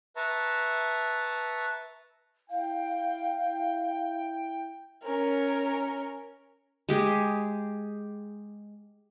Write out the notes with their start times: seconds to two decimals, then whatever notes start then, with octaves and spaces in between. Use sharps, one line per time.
0.16 B4 E5 A5 A#5 C#6
2.50 E4 F5 G5
5.04 C#4 A#4
6.89 G#3 G4 G#4